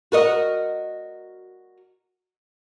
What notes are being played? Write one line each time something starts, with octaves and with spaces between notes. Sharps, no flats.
F#4 A#4 D#5